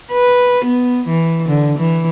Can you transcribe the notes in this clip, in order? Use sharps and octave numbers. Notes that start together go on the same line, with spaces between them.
B4
B3
E3
D3
E3